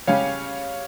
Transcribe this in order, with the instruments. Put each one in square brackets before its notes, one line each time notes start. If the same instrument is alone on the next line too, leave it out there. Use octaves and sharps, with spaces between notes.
[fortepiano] C#3 G3 C#4 G4 [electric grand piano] C#5 F5